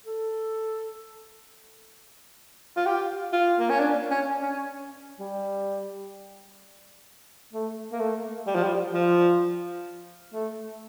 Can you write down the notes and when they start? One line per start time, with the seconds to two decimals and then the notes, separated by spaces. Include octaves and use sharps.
0.06 A4
2.76 F4
2.86 G4
3.33 F4
3.59 A#3
3.69 C#4
3.79 D4
4.11 C#4
4.42 C#4
5.20 G3
7.53 A3
7.92 A#3
8.00 A3
8.47 G3
8.55 F3
8.63 G3
8.93 F3
10.33 A3